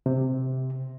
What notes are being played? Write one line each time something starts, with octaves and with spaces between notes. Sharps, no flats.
C3